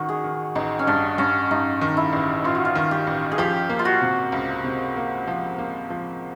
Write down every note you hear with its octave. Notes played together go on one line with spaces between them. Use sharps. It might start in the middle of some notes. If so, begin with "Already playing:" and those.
Already playing: A1 D#3 F#4
G#4
D#3
A1 D#4
C#4
G2 D4
G2 C#4
G2 D#4
D#3
E4
A1
A1 F4
F#4
F4
D#3
G4
A1
G#4
F3 G4
A#3
F4
F#4
C3
C#2
C3
A#3
F3
A#3
F3